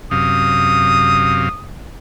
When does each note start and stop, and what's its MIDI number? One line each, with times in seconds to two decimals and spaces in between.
0.11 1.49 42
0.11 1.49 48
0.11 1.49 77
0.11 1.64 87